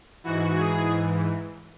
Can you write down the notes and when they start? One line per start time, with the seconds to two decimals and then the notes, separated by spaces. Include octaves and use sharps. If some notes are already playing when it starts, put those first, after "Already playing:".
0.24 G#2 E3 F#4
0.57 G#4